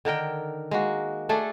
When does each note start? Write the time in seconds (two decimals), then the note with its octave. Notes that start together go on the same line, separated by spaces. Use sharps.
0.05 D3 D#3 A#4 G5
0.71 G#3 A#3 F#4
1.29 A3 D4 G#4 A4